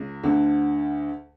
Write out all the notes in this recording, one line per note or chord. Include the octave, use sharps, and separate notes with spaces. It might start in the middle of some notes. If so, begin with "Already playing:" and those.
Already playing: C#2 C#3
D2 D3